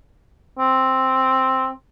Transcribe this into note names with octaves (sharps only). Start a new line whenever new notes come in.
C4